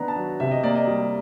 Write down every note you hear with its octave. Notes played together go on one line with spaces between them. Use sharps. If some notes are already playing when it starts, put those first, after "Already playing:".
Already playing: D#3 B3 D4 A#5
A5
F#3
C3 E5
D#5
A#3 D5
D#5
G3